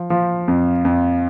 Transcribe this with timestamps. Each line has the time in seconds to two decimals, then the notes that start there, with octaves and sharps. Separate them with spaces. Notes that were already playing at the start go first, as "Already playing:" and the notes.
Already playing: F3
0.10 F3
0.48 F2
0.85 F2